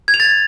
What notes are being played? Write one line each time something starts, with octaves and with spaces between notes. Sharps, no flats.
G#6
F7
A6